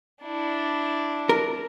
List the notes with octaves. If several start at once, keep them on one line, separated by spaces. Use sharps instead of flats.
D4 E4
A#4